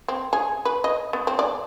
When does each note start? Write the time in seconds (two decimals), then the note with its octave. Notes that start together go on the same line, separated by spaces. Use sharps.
0.08 C4
0.33 G#4
0.65 B4
0.84 D#5
1.13 B3
1.27 C4
1.39 D5